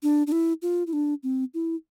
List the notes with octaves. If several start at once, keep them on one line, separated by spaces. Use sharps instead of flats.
D4
D4
E4
F4
E4
D4
C4
E4